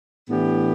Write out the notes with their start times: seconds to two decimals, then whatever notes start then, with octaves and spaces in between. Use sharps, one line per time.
0.28 A2 E3 B3 D4 G4